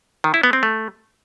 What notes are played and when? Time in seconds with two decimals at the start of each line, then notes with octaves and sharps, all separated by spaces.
0.24 D#3
0.34 E4
0.43 B3
0.53 C4
0.63 A3